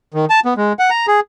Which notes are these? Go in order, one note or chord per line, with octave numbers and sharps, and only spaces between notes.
D#3
A5
B3
G#3
F#5
A#5
G#4